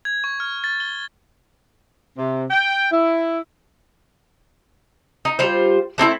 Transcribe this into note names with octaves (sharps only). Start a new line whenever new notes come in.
G#6
C#6
F6
A6
G7
C3
G5
E4
D#4
G3 F4 C5
A3 C4 D#4 E4